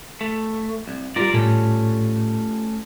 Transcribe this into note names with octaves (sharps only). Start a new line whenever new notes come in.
A3
C2
G3 F4 A#4 D5
A2 A3 C#4